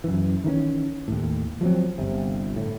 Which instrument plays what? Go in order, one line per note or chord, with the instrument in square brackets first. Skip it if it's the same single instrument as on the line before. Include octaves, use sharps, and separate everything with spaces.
[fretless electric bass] F#2 E3
D#3 E3 G#3 C#4
D#2 A2
F3 F#3 C4
G1 C3
A2